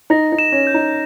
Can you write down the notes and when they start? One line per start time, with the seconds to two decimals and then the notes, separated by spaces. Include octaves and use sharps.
0.10 D#4 A#6
0.32 D#4
0.39 E7
0.52 C#4
0.67 G6
0.74 D#4